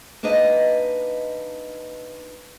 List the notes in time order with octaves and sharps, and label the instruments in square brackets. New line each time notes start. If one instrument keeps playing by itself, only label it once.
[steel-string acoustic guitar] A#3 D4 D#4 B4 D#5